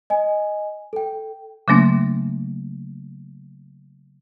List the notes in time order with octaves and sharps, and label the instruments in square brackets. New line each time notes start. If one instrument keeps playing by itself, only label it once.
[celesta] D#5 G#5
A4 G5
[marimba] C#3 F#3 A3 A#3 D4